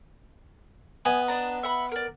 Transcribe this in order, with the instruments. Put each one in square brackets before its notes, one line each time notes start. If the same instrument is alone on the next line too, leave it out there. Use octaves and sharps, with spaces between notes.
[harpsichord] B3 D#5 [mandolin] G#5
[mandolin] D4 A#5
E5 F#5 B5
A#4 D5